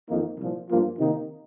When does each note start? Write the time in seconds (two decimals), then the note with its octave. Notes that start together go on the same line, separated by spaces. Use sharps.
0.09 F2 D#3 A#3 D#4
0.38 C2 A#2 F3
0.69 G2 F3 A#3 F4
0.99 C3 D#3 A#3 D#4